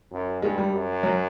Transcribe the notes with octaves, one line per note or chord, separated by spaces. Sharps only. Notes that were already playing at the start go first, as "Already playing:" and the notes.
F#2
G2 G#3
G3
F#2
F#3